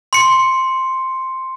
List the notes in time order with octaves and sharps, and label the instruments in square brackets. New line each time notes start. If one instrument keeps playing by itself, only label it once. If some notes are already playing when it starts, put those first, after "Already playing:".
[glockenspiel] C6 C#7